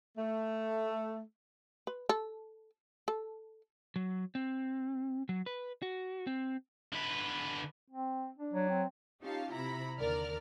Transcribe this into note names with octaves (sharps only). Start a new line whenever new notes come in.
A3
B4
A4
A4
F#3
C4
F#3
B4
F#4
C4
D3 B4
C4
D4
F#3
C4
C#4 D#4 F4 G4 F5 A5
C3 E4 A#5 B5
D#2 D3 A#4 D5 F6